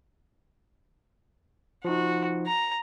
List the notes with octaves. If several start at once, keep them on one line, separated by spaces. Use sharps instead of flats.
F3 D#4 F#4
A#5